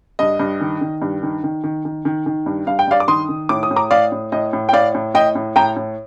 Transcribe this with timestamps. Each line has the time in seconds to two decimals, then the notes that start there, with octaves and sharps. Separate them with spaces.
0.19 G2 D#5
0.39 G2
0.61 D#3
0.81 D#3
1.02 G2
1.23 D#3
1.44 D#3
1.64 D#3
1.85 D#3
2.05 D#3
2.26 D#3
2.46 G2
2.67 G2 F5
2.79 G5
2.87 G2 D5 F5
3.00 D6
3.08 D#3 C6 D#6
3.29 D#3
3.49 A2 D6
3.63 D#6
3.71 A2
3.76 A#5 D6
3.91 A2 D5 F5
4.12 A2
4.32 A2 D#5
4.53 A2
4.69 G5
4.73 A2 D5 F5
4.95 A2
5.14 A2 D#5 G5
5.35 A2
5.56 A2 G5 A#5
5.76 A2